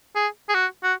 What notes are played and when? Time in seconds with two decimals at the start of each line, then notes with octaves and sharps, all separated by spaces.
0.16 G#4
0.49 G#4
0.54 F#4
0.83 F#4